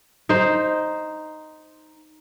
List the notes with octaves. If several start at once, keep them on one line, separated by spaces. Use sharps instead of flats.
D#4 C5